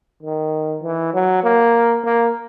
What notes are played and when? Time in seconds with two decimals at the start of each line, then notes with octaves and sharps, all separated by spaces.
0.23 D#3
0.83 E3
1.13 F#3
1.43 A#3
2.04 A#3